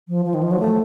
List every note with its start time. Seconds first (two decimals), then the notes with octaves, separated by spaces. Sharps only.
0.08 F3
0.25 F3
0.34 D#3
0.43 F3
0.51 F#3
0.60 A3